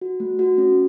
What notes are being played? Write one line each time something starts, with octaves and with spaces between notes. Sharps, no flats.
F#4
A3
F#4
C#4